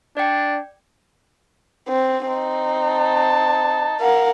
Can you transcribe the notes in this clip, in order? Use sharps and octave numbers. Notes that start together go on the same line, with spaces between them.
D4 D5 G5
C4
C4 D#4
A5
A#4 F5 F#5